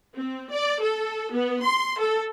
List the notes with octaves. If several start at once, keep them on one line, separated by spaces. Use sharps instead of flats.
C4
D5
A4
B3
C6
A4